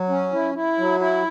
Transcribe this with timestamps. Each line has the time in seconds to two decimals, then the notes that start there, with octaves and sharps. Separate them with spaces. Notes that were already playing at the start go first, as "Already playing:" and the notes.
Already playing: F#3
0.09 C#4
0.33 E4
0.54 E4
0.78 F#3
1.00 E4